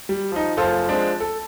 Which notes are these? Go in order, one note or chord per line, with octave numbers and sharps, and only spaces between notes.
G3
F3 D#4
F#1 F4 A4 C5 E6
F3 G#3 C4 D4
A4